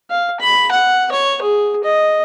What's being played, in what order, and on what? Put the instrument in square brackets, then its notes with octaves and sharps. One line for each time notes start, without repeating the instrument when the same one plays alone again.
[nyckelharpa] F5
B5
F#5
C#5
G#4
D#5